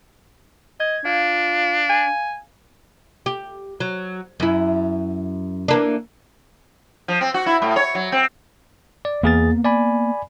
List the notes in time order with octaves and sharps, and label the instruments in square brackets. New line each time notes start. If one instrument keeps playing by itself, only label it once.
[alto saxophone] D#5 [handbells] G#6
[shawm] D4 [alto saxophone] F4 [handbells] F5
[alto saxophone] G#5
[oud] G4
F#3
F#2 E4
E3 A#3 D4
[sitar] F3
C4
F#4
E4
A2
C#5
F#3
C4
[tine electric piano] D5
[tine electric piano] E2 G#4 A6 [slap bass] A#3 B3
[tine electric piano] D5 G#5 B5